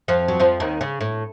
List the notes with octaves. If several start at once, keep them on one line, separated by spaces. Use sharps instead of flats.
F2 F3
F#3
F2 F3
D#2 D#3
C#3
A2